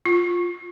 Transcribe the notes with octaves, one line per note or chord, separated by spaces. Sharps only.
F4